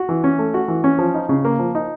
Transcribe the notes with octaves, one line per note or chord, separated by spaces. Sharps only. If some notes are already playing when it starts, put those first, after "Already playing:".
Already playing: F#4
E3
C#4
A3
F#4
E3
C#4
F3
D#4
C#3
A#3
F3
D#4